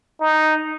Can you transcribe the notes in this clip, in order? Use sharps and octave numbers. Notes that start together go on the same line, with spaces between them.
D#4